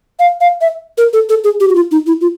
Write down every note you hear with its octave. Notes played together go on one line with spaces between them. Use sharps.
F5
F5
E5
A#4
A4
A4
G#4
G4
F#4
F4
D#4
E4
F4